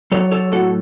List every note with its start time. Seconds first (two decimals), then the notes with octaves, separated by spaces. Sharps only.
0.12 F#3 A4 C#5
0.31 A4 C#5
0.52 A2 F#4 A4